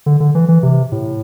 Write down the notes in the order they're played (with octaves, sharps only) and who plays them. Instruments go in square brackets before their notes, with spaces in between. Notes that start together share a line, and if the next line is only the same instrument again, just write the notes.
[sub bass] D3
D3
E3
E3
C3
A2